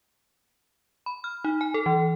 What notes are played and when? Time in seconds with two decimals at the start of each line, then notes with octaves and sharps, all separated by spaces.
1.06 B5
1.24 F6
1.44 D#4
1.61 G#5
1.74 A4
1.86 E3